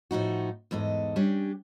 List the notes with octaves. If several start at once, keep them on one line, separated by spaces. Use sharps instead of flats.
A2 F3 D#4 F#4
E2 G#2 A4 D#5
G3 C#4 D4 G4